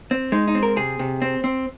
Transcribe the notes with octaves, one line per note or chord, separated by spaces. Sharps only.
C4
G#3 D#4
D#4
C4
A#4
C3 G#4
C3
C4
C4